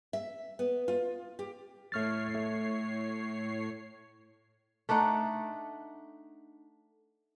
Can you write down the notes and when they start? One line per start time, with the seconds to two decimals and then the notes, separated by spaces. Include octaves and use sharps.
0.13 E5
0.59 B3
0.88 F4
1.39 G4
1.92 A2 A3 C#5 F6 A6 C7
2.35 A3
4.89 A3 D4 D#4 F#5